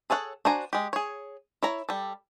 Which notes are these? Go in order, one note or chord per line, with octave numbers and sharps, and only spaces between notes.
G#4 A4 C#5 F5 F#5
D4 F#4 C5 G#5 A#5
G#3 G4
G#4 C#5
E4 C#5 A#5
G3 A4